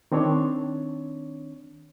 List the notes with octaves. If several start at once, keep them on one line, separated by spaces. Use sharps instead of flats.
D#3 C4 D4 C#5